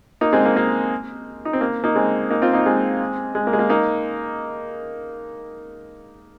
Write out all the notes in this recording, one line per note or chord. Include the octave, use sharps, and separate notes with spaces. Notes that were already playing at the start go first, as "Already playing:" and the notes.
A#3 D#4
G#3 C4
A#3
A#3
D#4
C4
A#3
A#3 D#4
G#3 C4
A#3 D#4
C4 F4
A#3 D#4
G#3 C4
G#3
A#3
G#3
A#3
A#3 D#4